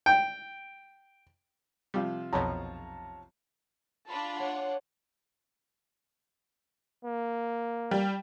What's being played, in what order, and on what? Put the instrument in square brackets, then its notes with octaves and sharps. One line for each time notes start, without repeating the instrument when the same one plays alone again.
[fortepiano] G5
[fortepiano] C3 F3 F4 [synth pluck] G3
[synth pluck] B1 F2 B2 [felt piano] C#5 A5 A#5
[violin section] D4 F4 [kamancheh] A5 B5
[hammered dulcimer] C#5 [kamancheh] F#5
[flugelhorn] A#3
[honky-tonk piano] G3